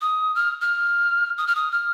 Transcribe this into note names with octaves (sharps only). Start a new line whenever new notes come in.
D#6
F6
F6
D#6
F6
D#6
F6